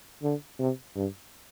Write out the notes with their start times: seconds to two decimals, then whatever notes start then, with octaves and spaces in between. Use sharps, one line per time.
0.23 D3
0.59 C3
0.96 G2